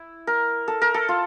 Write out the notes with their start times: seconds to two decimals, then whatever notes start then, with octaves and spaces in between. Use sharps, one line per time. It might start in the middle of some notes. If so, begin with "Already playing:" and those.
Already playing: E4
0.27 A#4
0.68 A4
0.82 A#4
0.94 A4
1.09 F4